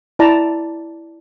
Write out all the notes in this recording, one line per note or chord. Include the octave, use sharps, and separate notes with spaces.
E4 D5 A5 A#5